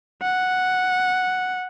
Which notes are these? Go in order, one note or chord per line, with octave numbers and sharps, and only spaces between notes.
F#5